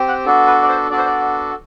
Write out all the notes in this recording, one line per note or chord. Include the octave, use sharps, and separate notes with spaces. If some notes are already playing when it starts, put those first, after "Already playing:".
Already playing: C4 G4
F#5
B3 D4 F#4 A4
B4
D5
C5
B3 D4 F#4 A4 D5
C5
D5